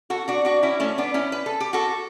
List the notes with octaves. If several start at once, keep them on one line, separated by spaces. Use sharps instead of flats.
F#4 A4
D4 F#4
D4 F#4
C#4 E4
A3 C#4
B3 D4
C#4 E4
B4
A4
G4
F#4 A4